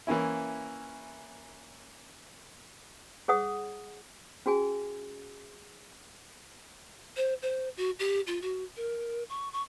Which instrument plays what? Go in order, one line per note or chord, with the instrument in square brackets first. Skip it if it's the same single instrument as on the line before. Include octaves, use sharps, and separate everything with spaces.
[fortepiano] E3 A#3 C#4 E4
[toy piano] G#4 C#5 F#5 D#6
C#4 F#4 G#4 G#5
[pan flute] C5
C5
F#4
G4
F4
F#4
A#4
C#6
C#6